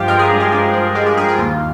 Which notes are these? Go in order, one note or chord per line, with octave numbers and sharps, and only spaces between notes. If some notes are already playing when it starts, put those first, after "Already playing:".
Already playing: G2 F3 F4 G4
G#3 A#4
G#4
G2
F4
G2 G4
F3
G#3 F4
G4
G2 G#4
F4
D#2 F4